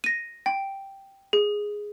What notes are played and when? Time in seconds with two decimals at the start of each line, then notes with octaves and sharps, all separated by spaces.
0.04 A#6 D#7
0.46 G5
1.33 G#4